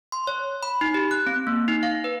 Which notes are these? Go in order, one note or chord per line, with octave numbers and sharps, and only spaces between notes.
C6
C#5
B5
D#4
G4
F#6
C4
A#3
D#4
F5
B4